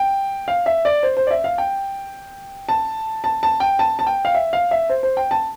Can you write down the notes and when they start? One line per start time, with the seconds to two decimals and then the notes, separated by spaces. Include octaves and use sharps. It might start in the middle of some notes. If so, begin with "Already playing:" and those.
Already playing: G5
0.48 F5
0.66 E5
0.85 D5
1.03 C5
1.17 C5
1.27 D5
1.31 E5
1.44 F5
1.58 G5
2.69 A5
3.24 A5
3.43 A5
3.60 G5
3.79 A5
3.99 A5
4.07 G5
4.25 F5
4.35 E5
4.53 F5
4.71 E5
4.89 C5
5.03 C5
5.17 G5
5.31 A5